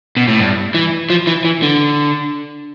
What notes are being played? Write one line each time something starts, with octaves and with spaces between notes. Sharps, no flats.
B2
A2
G2
E3
F3
E3
E3
D3